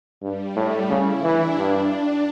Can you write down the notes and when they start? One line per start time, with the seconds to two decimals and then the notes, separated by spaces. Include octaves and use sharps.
0.22 G2 G3
0.56 A2 A3
0.89 C#3 E4
1.24 E3 D4
1.58 G2 D4
1.91 D4